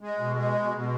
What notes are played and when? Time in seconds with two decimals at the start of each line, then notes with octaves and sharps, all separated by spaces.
0.01 G#3
0.18 B2
0.36 G#3
0.55 B2
0.73 B2